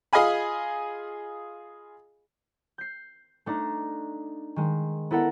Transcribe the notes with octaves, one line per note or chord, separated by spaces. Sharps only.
F4 G#4 D#5 F5 G#5 B5
G6 C7
A3 D4 D#4 A#5
D#3 G#3
B3 E4 A4 A#4 F#5